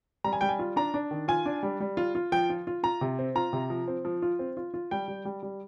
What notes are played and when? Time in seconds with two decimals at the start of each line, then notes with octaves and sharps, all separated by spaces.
0.24 G3 A#5
0.33 G#5
0.41 G3 G5
0.49 G#5
0.59 F4
0.76 D4 A#5
0.94 D4
1.11 D#3
1.28 F4 G#5
1.46 D4
1.63 G3
1.80 G3
1.97 F4
2.15 F4
2.32 F3 G5
2.50 F4
2.67 F4
2.83 F4 A#5
3.01 C3
3.19 C4
3.35 F4 A#5
3.53 C3
3.70 F3
3.88 C4
4.05 F3
4.22 F4
4.39 C4
4.57 F4
4.74 F4
4.91 G3 G5
5.08 G3
5.25 G3
5.43 G3